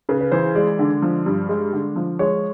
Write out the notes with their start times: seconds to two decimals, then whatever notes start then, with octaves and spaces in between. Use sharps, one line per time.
0.09 C#3 B4
0.21 B4
0.32 E3 C5
0.55 G#3 D5
0.79 D3
1.02 F3
1.26 G2
1.49 G#3
1.73 D3
1.96 F3
2.19 G#3 C#5